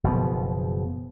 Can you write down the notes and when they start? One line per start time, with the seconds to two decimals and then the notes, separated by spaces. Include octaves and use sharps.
0.04 F#1 B2 F3 B3